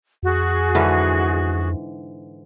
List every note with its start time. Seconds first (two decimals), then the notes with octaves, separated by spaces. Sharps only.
0.23 F2 F#4 G#4
0.75 G#2 D3 E3